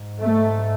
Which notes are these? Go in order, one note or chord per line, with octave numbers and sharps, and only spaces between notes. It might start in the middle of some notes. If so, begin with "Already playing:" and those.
Already playing: G#2
A3